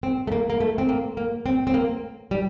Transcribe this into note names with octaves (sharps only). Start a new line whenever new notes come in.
C4
A3
A#3
A#3
A3
C4
A#3
A#3
C4
C4
A#3
G3